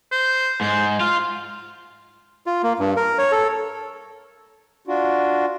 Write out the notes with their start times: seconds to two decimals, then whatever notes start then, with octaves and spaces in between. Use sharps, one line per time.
0.12 C5
0.61 G#2 C5
1.00 F4 F5
2.46 F4
2.63 A#3
2.79 G2
2.96 A#4
3.18 C#5
3.32 A4
4.88 D4 F4 F#4